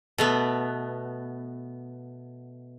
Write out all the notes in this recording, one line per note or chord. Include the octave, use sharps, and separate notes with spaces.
B2 A3 B3